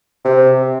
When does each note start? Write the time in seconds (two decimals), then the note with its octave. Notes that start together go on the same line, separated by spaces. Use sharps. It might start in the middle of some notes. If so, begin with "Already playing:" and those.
0.24 C3